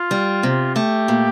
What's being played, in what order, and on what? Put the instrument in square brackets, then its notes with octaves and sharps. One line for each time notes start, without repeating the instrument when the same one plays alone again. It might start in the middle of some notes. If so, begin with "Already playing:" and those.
Already playing: [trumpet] F4
[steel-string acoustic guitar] G3
C3
[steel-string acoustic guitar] A3 [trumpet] G4
[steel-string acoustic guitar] A#2